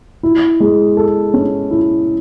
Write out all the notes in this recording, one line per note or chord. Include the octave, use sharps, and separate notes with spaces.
E4
G#3
A4
C#4
E4